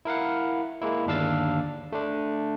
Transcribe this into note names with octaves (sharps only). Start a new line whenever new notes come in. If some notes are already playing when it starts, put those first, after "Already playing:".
E4 A#4 F5 F#5
G#3 A#3 E4
G1 D#2 D4 F5 E6 A6
A3 D4